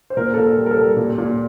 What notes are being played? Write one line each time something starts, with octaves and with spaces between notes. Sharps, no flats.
C5
A#2 A#4
A#2 A4
A#4
G3
A#4
A4
G3
A#2
A#2